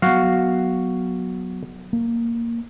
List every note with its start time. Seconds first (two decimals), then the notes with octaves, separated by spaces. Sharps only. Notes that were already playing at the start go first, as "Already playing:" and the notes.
0.02 F#3 B3 F#4 F5
1.93 A#3